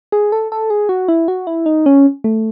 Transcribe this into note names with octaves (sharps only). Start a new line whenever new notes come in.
G#4
A4
A4
G#4
F#4
E4
F#4
E4
D#4
C#4
A3